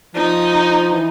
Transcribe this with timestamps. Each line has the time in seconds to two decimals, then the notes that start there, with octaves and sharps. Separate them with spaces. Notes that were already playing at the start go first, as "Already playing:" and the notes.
0.14 F3 D#4
0.93 E3